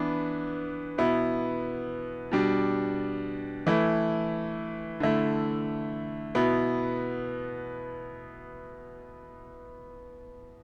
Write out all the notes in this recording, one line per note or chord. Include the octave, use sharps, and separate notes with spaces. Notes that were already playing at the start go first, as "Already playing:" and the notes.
Already playing: E3 B3 D4
B2 B3 E4
B2 G3 D4
E3 A3 E4
D3 A3 E4
B2 B3 E4